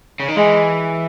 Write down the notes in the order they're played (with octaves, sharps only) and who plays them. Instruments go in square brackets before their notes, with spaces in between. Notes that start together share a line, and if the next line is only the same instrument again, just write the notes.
[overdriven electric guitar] C#3
D#3
[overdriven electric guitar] E3 [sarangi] G#3